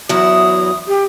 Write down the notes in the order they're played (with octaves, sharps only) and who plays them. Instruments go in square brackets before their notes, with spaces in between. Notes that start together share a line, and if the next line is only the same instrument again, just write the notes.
[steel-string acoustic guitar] E2 F#3 E4 [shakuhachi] D#6
[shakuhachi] G4